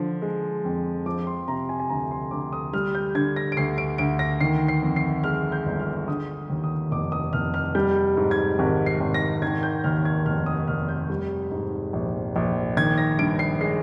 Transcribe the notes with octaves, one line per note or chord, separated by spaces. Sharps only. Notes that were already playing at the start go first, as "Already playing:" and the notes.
Already playing: D3 F3
G#3
F2
F3 D6
C6
C3 A#5
G#5
G#5
D2 A#5
C6
D2 D6
D#6
G3 F6
G6
D3 G#6
A#6
D7
D2 C7
D7
D2 D7
A#6
D#3 C7
C7
F2
C7
G#3 F6
G6
G1
F6
D3 D#6
D#2
D#6
F1 D6
D#6
F1 F6
F6
G3 G6
G#2
G#6
G#1
C7
G#1
A#6
D#3 G#6
G6
D#2 F6
G#6
F1 F6
D#6
F1 F6
G6
G3
G#2
A#1
A#1
D#3 G#6
A#6
G2 D7
C7
G#3 C7